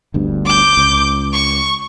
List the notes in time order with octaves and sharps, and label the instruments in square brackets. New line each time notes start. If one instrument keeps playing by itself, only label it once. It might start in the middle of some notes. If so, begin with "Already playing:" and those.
[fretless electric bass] G1 D2 G2
[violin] D6 G6
[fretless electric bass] C#2
[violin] C#6